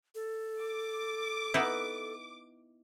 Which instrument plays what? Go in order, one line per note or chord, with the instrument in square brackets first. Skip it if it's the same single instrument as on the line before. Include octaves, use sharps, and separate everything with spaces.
[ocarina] A4
[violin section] D6
[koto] B3 D#4 E4